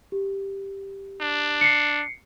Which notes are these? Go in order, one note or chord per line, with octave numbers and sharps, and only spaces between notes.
G4
D4
C7 C#7